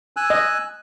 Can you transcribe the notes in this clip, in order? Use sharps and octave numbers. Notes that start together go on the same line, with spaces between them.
G#5 E6 F#6
D#5